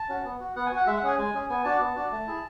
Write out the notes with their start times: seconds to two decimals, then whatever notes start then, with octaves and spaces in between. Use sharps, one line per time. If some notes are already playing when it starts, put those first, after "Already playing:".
Already playing: A5
0.09 C#4 F#4
0.24 B3
0.40 F#4
0.56 B3 F#5
0.66 G#5
0.71 F#4
0.77 F#5
0.87 G#3 E5
0.97 F#5
1.03 C#4 G#4 G#5
1.18 G#3 G#5
1.34 C#4 G#4
1.49 B3 G#5
1.64 D4 F#4 A5
1.81 B3
1.96 D4 F#4
2.12 A3
2.27 E4 G#4